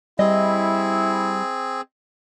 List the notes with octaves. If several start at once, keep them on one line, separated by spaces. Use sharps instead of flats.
G3 C4 E4 G#4 D#5